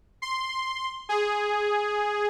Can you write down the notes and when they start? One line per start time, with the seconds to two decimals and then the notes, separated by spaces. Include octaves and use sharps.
0.22 C6
1.09 G#4